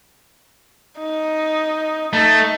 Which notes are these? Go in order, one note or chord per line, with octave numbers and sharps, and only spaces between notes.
D#4
A3 D#4